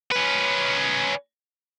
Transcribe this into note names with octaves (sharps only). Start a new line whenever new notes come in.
C#4 B4